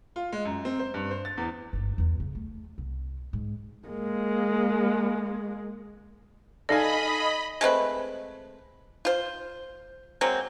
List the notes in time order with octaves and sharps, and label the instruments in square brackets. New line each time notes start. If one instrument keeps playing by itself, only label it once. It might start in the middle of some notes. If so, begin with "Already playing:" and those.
[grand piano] F4
G#3
F#2
C4
C5
G2
C5
A6
E2
[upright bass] G1 G#2
E2 F4
C#3
A3
C2
G#2
[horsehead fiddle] G#3 A#3
[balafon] D#4 D5 [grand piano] A4 F5 G#5 [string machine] D#5 B5
[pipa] G#3 A3 C4 B4
F4 C5
F#3 G#3 A#3 C4